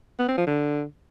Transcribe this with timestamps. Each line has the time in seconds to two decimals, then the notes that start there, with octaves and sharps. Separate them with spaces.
0.19 B3
0.28 C4
0.37 F3
0.47 D3